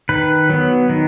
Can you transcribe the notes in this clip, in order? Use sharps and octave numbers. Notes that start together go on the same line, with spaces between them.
D#3 B4
F#3 B3
D#3